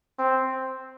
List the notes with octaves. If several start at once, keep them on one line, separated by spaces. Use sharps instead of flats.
C4